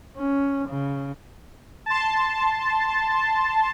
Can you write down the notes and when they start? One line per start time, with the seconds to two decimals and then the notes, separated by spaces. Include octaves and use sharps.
0.17 C#4
0.69 C#3
1.86 A5 C6